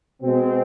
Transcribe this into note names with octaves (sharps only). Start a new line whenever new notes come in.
B2 G#3 C4